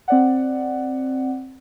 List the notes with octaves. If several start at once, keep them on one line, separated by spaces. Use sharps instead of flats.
C4 D5 F#5